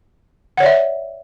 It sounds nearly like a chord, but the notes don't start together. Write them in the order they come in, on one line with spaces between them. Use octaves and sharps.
F#5 C#5 D5 E5